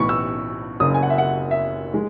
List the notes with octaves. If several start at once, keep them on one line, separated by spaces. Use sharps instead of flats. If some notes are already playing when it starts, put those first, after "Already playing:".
Already playing: B1 A2 E3 B3 B5 C#6
E6
F#1 F#2 C#3 D#6
G#5
F#5
E5
F#5
E5
G#3